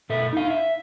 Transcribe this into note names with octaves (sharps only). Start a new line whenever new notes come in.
B2 A4 E5
D#4 F5
E5